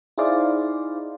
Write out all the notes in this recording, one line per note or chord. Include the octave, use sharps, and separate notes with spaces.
D#4 E4 G#4 C5 D5 F5